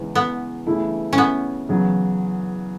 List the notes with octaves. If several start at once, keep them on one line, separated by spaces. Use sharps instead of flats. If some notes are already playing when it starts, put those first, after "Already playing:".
Already playing: E2 C#3 E3 G#3 C#4
B3
C#3 E3 A3 E4
C#4
B3
E2 C#3 F#3